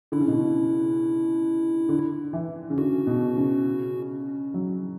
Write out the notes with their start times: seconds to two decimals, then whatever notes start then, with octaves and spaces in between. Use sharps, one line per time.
0.12 D3 E4
0.20 C#3
0.28 B2
0.35 C#3
1.89 D3
2.33 E3
2.70 C#3
2.77 D3 F#4
3.07 B2
3.36 C#3
4.54 F#3